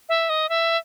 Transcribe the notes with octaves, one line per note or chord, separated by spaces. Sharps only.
E5
D#5
E5